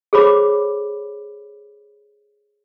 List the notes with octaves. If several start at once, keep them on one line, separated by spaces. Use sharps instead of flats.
G#4 A4 C5 C#5 B5 D6